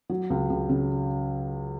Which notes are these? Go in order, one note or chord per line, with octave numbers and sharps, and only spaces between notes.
F#3
C#2
C#2
C#3